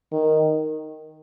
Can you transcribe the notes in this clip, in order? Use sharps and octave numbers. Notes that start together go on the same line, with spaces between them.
D#3